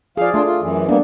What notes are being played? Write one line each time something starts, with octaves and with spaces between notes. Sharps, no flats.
F3 G#4 D5 F5
A3 D4 F4
F4
F#2 E3
G3 A#3 B3 D4